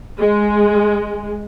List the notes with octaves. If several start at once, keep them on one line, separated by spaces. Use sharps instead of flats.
G#3